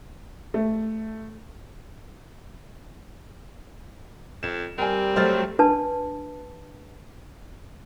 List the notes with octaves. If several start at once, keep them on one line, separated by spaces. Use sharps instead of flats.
A3
F2 E7
G3 C4 A#4 G#5
F#3 A3 C5 F6 A6
D4 B4 A5